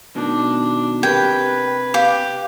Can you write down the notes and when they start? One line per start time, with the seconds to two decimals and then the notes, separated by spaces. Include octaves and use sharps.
0.16 B2 D#3 D4
1.03 C3 G4 A#4 B4 G5 A5 G#6
1.94 G4 F5